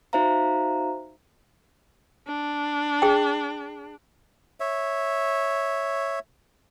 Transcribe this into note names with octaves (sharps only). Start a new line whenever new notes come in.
D#4 F#4 C5 E5 F5 A#5
D4
G#4 G5
C#5 E5